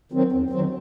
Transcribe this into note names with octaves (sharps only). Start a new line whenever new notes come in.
D#3 F#3 C4
E2
D#3 F#3 C4